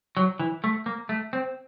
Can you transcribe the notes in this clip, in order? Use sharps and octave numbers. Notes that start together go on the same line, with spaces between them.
F#3
E3
A3
A#3
A3
C4